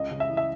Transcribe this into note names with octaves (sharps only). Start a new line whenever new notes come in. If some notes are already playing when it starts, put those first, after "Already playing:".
Already playing: C#2 D#5
C#3
E5
E3
E5